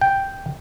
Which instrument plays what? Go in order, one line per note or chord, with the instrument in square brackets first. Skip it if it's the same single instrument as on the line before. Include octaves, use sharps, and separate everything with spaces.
[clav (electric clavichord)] G5